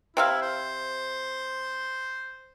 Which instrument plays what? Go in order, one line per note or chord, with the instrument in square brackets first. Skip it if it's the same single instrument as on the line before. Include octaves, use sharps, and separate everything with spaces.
[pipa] C3 E5 F5 [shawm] E4
[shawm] C5